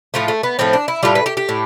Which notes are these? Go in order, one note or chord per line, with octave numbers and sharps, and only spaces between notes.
A2 F3 A3 F4
A3
B3
A2 F3 A3 C4
D4
E4
A2 G3 F4
B4
G4
G4
A2